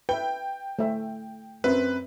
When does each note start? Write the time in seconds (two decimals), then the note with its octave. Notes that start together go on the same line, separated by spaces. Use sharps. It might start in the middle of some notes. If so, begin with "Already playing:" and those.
0.09 B4 E5 G5 G7
0.79 A3 E5
1.64 F#2 C4 A#4 B4 E5